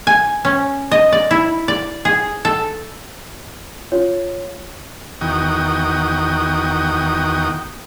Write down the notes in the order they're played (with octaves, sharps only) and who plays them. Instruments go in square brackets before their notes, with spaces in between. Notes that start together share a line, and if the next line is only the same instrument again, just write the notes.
[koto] G#5
C#4
D#5
D5
E4
D5
G#4
A4
[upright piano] F4 [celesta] C#5
[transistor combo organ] E2 D#3 F#4 G5 D#6